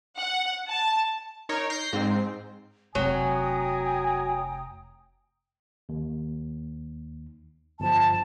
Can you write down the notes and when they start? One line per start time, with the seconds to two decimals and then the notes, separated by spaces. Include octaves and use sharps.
0.17 F#5
0.68 A5
1.49 D#4 A#4 C#5
1.70 G6 A#6 C7
1.93 G#2 C4
2.95 F1 F#3 G5 G#5 A#5 D#6
5.89 D#2
7.80 G1 F3 A5